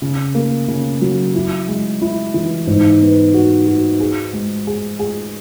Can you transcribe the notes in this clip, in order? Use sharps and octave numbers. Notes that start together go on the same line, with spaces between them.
C#3
A#3
C#3
F#3
E4
G#3
E4
E3
G#2
B3
F#4
F#4
G#4
G#3
G#4
G#4